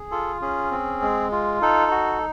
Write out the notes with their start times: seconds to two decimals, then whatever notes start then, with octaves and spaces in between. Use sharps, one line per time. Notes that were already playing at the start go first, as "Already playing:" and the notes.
Already playing: G#4
0.11 F4 A4
0.41 C#4 G#4
0.71 C4
1.02 G#3
1.31 F4
1.62 D#4 A4
1.91 F#4